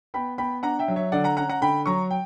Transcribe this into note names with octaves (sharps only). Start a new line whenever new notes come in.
B3 G5 B5
B3 G5 B5
D4 F#5 A#5
E5 G5
F#3
C#5 E5
D3 D5 F#5
F#5 A#5
C#4 F#5 A#5
F#5 A#5
D3 G5 B5
F#3 A#5 C#6
G5